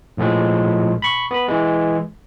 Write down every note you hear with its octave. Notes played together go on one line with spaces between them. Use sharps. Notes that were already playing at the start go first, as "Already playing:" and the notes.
A#1 A2 F3 G#3
B5 C#6
B3 B5
E3 G#3